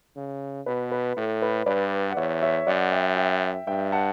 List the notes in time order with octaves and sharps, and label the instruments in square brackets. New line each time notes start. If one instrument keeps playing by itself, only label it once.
[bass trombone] C#3
[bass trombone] B2 [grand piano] B4
[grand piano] B4
[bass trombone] A2 [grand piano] A4
[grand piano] B4
[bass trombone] G2 [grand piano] B4 D5
[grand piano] F#5
[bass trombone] E2 [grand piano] C#5 E5
[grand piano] C#5 E5
[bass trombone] F#2 [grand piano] D5 F#5
[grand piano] E5 G5
E5 G5
[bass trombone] G2 [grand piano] E5 G5
[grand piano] F#5 A5